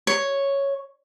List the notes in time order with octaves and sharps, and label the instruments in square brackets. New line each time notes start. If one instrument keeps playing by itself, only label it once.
[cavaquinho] C#5